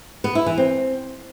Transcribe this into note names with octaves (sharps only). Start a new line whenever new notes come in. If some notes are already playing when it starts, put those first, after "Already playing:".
B3
E4
E3
C4